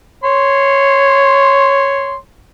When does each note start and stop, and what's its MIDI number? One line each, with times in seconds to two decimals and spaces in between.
0.24 2.15 73
0.24 2.15 84